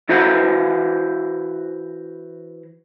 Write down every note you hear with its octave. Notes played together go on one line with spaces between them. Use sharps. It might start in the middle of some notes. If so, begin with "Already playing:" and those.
E3 E4 F#4 C5 A#5